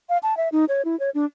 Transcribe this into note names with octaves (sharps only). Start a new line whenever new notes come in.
F5
A5
E5
D#4
C#5
E4
C#5
D4